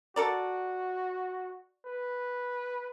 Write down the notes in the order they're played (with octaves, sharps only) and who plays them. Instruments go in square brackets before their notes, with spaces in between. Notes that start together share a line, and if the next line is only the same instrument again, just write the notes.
[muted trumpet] F#4 [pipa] A4 A#4 D5
[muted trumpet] B4